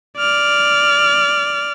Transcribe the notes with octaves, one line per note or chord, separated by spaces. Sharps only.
D5 F6